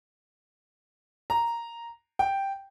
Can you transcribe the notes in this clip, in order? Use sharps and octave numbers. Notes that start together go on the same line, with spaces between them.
A#5
G5